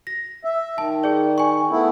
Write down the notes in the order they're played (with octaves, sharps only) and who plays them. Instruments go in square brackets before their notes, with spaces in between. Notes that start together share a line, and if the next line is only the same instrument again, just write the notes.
[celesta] A#6
[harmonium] E5
[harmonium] D#3 [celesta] A5
[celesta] G#4 D5
G#5 C#6
[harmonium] A3 B3 E4